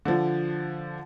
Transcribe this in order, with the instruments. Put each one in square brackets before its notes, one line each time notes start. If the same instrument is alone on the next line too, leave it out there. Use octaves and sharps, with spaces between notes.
[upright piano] D3 F3